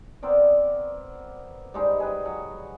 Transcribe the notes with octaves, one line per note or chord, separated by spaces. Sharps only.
B3 C4 A#4 D5
G3 G#3 D#4 C5
G#4 B4 G5
F#3